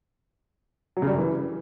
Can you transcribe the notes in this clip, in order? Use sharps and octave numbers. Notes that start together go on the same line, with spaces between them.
F#3
C#3
G3
F#2
E3